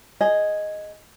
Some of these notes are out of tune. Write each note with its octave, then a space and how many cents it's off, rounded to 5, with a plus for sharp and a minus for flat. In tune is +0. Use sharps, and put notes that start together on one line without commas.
G#4 +0 D#5 +0